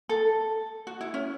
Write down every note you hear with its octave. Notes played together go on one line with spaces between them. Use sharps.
A4
F#4
E4
C#4